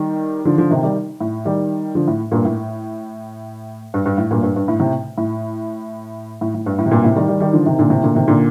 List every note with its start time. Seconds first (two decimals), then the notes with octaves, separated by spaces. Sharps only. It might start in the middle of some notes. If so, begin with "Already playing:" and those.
Already playing: D#3 G3
0.45 D3 F3
0.58 D3 F3
0.71 C3 D#3
0.83 D#3 G3
1.21 A2
1.45 D#3 G3
1.95 D3 F3
2.08 A2
2.32 G2 A#2
2.45 A2
3.94 G2
4.06 G2
4.18 A2
4.31 G2 A#2
4.43 G2
4.56 G2
4.68 A2
4.80 A2 C3
5.18 A2
6.41 A2
6.54 A2
6.66 G2
6.79 A2
6.86 C3
6.91 G2 A#2
7.04 A2 C3
7.16 D#3 G3
7.28 D#3 G3
7.40 D#3 G3
7.53 D3 F3
7.66 C3 D#3
7.79 A#2 D3
7.90 A2 C3
8.02 A#2 D3
8.15 C3 D#3
8.28 A#2 D3